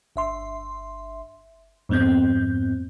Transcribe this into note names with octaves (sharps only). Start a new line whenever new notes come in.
G1 E5 C6
F2 G#2 B3 C4 G6